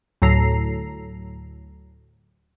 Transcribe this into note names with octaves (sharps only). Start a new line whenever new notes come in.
D2 A2 F#3 A4 A#5 C7